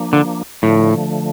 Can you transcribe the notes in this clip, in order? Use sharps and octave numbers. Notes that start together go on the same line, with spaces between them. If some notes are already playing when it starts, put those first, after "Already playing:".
Already playing: F3 A#3 D4
D3
A2 D3 F3 A3